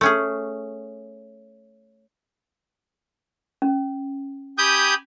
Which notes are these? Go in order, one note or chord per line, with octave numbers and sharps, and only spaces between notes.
A3 C#4 G#4
C#4
G4 G#5 B5 D#6 G6